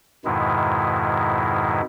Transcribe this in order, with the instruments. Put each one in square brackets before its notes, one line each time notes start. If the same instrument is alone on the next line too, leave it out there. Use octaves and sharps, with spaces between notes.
[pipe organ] F2 G#2 B2 D#3 G#3 E4